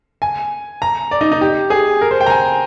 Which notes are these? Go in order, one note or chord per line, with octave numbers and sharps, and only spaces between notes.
G#5
A#5
D5
D#4
D#4
G4
G#4
A#4
C5
G5
A#5
G#5